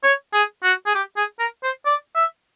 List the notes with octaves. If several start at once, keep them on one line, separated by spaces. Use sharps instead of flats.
C#5
G#4
F#4
G#4
G4
G#4
A#4
C5
D5
E5